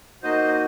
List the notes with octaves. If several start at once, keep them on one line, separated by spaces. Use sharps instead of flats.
A#3 D#4 F#4 C5 D#5